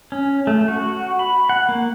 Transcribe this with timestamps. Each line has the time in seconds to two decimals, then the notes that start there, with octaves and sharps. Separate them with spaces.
0.12 C#4
0.47 A3
0.68 F#4
1.19 B5
1.49 F#5
1.69 A#3